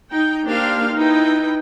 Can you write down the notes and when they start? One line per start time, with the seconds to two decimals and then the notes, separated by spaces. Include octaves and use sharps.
0.11 D#4 G5
0.44 A#3 D4 G4 C5 F5
0.95 D#4 E4 B4 G5